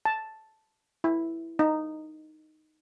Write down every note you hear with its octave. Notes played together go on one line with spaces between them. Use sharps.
A5
E4
D#4